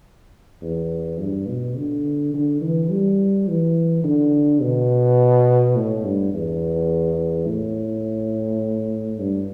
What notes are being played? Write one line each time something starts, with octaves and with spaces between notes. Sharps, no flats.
E2
G2
B2
D3
D3
E3
G3
E3
D3
B2
A2
G2
E2
A2
G2